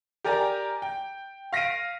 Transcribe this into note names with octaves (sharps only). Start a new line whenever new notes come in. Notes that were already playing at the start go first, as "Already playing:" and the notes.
G4 A#4 D5 G#5 A#5
G5
F5 A#6 B6 D7 D#7